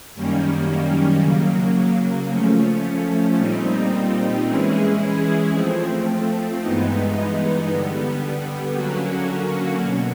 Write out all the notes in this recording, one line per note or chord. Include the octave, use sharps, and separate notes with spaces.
F#2 D#3 G3 A#3 C#4
C#3 F#3 A#3
F3 A3 C#4
A#2 G3 C4 D#4
E3 G#3 C#4 E4 G#4
F3 A3 C4
G2 E3 G#3 B3 D#4
D3 G3 B3
D3 F#3 A#3 C#4 F#4
B2